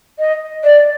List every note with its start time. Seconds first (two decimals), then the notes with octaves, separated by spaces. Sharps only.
0.19 D#5
0.64 D5